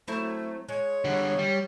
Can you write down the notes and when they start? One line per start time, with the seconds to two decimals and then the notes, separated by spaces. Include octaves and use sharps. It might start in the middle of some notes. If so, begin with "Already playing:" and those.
0.08 F#3 A3 C4 E4
0.69 G#3 C#5
1.05 D3 G3
1.39 G3